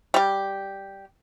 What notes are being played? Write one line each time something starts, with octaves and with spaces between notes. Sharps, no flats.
G3 G4